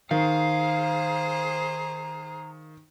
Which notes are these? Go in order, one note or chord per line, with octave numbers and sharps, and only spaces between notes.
D#3 G#4 C5 F5 A#5